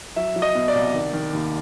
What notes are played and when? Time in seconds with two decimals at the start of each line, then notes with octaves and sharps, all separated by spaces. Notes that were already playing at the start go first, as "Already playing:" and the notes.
0.16 F#3 E5
0.36 F#3
0.42 D#5
0.55 B2
0.68 D5
0.75 C2
0.94 D#3
1.13 D#3
1.33 D#2